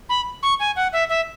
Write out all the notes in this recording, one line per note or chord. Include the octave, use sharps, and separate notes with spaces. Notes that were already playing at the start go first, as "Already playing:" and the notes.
B5
C#6
G#5
F#5
E5
E5